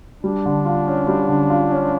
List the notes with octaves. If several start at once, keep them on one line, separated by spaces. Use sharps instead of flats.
G3 D4
D3
F4
C#4
G3
D3
F4
C#4